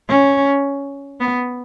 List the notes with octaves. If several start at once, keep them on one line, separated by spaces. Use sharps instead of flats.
C#4
B3